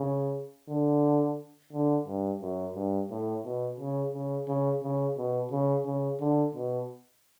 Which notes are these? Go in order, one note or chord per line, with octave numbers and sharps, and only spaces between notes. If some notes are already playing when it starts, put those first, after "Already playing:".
Already playing: C#3
D3
D3
G2
F#2
G2
A2
B2
C#3
C#3
C#3
C#3
B2
C#3
C#3
D3
B2